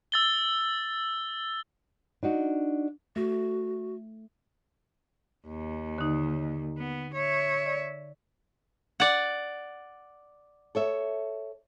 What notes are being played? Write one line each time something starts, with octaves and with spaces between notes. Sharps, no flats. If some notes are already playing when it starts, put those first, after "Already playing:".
E6 A6 G7
D4 D#4 F#4
A3 F#4
D#2
D3 D#4
B3
C#5 E5
D5
D5 F#5
A4 C#5 E5